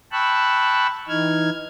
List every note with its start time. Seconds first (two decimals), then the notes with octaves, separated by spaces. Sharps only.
0.12 G5 A5 B5 C#6 E6 F#6
1.09 E3 D#4 F6 G#6